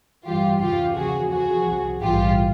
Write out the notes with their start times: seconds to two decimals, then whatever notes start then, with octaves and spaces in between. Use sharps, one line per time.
0.25 G1 G2 E3 G3 F4 G4
0.60 E2 C#3 E3 F4 G4
0.95 D#2 C#3 F3 F#4 G#4
1.31 E2 C3 F3 F#4 G#4
1.66 C2 C3 F3
2.01 A#1 G#2 E3 G3 F4 G4